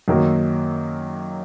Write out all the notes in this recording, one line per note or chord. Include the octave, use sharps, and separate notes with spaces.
F#2 D#3 F#3 A#3